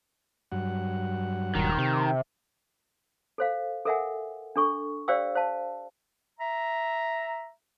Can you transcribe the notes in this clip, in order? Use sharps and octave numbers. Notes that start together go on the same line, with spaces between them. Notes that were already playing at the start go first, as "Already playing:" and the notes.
G2 F#3 F#5
D#1 D#3
C3
A4 C5 F5
A4 A#4 E5 F#5 G#5
D4 A4 C#6
G4 C5 D5 F5 G5 E6
C5 F5 A5
E5 A#5